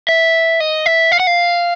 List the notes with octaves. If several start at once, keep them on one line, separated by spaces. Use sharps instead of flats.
E5
D#5
E5
F5
F#5
F5